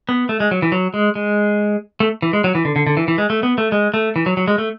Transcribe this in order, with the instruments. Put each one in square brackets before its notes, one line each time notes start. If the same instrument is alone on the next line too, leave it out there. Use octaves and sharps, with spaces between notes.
[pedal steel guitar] B3
A3
G#3
F#3
E3
F#3
G#3
G#3
A3
E3
G#3
F#3
E3
D3
D3
D3
E3
E3
G#3
A3
B3
A3
G#3
A3
E3
F#3
F#3
G#3
A3